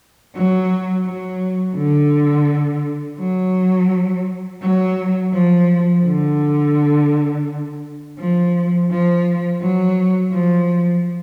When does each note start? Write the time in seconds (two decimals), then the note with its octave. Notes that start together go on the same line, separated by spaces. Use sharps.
0.35 F#3
1.05 F#3
1.76 D3
3.19 F#3
4.62 F#3
5.33 F3
6.04 D3
8.18 F3
8.90 F3
9.61 F#3
10.31 F3